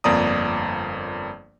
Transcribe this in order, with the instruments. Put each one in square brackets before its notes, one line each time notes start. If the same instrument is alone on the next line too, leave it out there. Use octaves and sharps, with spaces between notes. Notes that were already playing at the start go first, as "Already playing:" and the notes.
[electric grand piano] G1 F2 A#3 D5 A#5 D#6